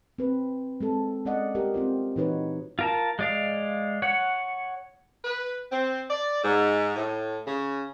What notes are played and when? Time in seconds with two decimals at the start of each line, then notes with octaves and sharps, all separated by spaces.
0.18 C4 B4
0.81 G#3 C4 A4
1.25 G#3 C#4 D5 D#5 F#5
1.55 G4 A#4
1.74 C4 F4 C5
2.16 A#2 E3 D#4 F#4 B4 C#5
2.79 F4 A#4 A5
3.19 G#3 D5 F5
4.02 C#5 F#5
5.25 B4
5.72 C4
6.10 D5
6.44 G#2
6.96 A2
7.47 C#3